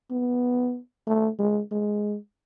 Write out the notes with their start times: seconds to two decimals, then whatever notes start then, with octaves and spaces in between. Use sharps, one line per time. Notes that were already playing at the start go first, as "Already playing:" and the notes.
0.11 B3
1.07 A3
1.39 G#3
1.72 G#3